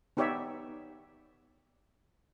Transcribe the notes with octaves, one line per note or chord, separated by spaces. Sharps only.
B3 D#4 G4 C#5 D5 E5